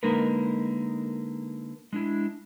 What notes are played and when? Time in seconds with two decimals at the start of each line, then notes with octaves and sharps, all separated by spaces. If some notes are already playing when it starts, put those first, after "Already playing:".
0.03 D3 G#3 A#3 D#4 A#4 B4
1.93 G#3 D4 E4